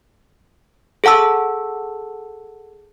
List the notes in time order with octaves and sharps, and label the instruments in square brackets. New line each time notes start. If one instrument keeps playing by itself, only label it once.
[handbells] G#4 A4 F#5 A5 E6